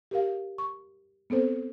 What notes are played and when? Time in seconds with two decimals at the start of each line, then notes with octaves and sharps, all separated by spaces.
0.11 G4 A#4 F5
0.58 C#6
1.30 B3 C4 A4 C5